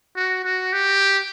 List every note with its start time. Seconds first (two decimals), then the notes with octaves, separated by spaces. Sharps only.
0.16 F#4
0.45 F#4
0.73 G4